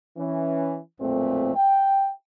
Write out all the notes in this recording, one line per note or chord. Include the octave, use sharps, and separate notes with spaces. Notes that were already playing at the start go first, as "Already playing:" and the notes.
E3 C#4
B1 F2 A#2 A3 C4
G5